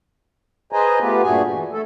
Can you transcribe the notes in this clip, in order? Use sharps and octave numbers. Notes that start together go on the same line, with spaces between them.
G#4 B4 C5 D#5 G#5 A#5
A3 B3 F4 G4 B4
G2 A#2 A3 F#4 G#4 G#5
E3
A3 A4